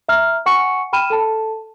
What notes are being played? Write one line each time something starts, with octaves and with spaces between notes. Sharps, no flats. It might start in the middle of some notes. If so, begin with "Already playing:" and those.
E5 A#5 F6
F#5 G#5 C#6 C#7
G5 B5 F6 D#7 E7
A4 A5